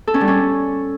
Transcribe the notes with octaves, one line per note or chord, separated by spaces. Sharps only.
A4
C#4
G3
C#4